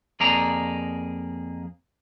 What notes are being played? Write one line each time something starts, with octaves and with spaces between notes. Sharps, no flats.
F2 A#3 G#4 D5 A#5